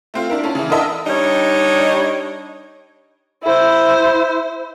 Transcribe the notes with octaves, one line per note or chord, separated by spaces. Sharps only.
A3 C4 F4
D4 E4 A#4
C#4 A5
C#3 E3
D4 A4 A#4 D#5 E5 A5
G3 D4 D#4 C#5 D#5
E4 C5